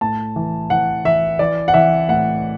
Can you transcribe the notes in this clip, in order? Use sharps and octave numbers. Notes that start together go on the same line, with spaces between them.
A2 A5
E3
E3 F#5
E3 E5
E3 D5
F#5
E3 E5
A2 F#5